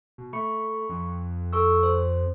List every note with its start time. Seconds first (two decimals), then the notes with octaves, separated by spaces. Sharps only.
0.18 B2
0.33 A3 B5 C#6 C#7
0.89 F2
1.53 A4 C#6 E6
1.83 C5